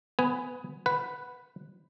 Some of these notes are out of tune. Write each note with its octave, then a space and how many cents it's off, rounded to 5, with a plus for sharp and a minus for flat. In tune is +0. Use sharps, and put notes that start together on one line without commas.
B3 +20 B4 +0 G#5 +0
B4 +0 F#5 +0